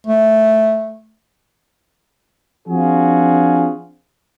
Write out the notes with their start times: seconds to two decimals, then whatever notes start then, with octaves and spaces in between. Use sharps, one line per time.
0.07 A3
2.68 F3 C4 D4 F4 F#4 G#4